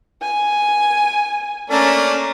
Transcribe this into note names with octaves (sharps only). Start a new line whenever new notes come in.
G#5
A3 A#3 C#4 D4